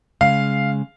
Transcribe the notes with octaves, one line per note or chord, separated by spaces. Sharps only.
C#3 G#3 F5